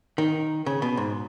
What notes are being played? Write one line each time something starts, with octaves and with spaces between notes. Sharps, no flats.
D#3
C#3
B2
G#2